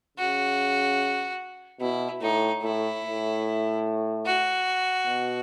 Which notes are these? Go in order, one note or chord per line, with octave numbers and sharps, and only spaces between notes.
C#3 F#4
B2 E4
A2 D#4
A2 E4
A2
F#4
B2